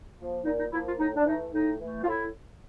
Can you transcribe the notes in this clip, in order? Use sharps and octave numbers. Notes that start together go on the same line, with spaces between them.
F3 A#3
A#2 D#4
D#4
F3 A#3 E4
F4
A2 D#4
D4
E3 A3 D#4
A2 D#4
E3 A3
F4
A2 E4